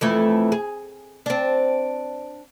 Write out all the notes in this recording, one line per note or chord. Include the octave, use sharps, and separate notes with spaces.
F2 E3 A3
G#4
C4 D4